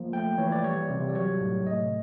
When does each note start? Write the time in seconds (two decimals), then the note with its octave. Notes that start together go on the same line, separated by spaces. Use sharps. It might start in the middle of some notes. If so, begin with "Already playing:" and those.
Already playing: F3 A#3
0.13 A3 G5
0.38 E3 C#5
0.52 D5
0.64 G3 C#5
0.90 C3
1.09 D5
1.15 F#3 C#5
1.41 A2
1.67 A3 D#5